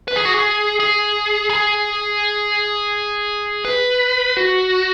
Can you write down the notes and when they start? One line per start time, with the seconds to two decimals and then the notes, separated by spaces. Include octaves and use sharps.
0.08 B4
0.16 G#4
0.25 F#4
0.34 G#4
0.80 G#4
1.50 G#4
3.65 B4
4.37 F#4